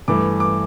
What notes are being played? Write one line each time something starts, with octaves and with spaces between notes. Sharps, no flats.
G2 E3 A3 D6
D6